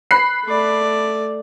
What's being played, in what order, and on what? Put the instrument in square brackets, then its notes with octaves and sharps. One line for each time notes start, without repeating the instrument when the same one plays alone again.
[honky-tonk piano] B5 F#6 C7
[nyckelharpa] A3 D5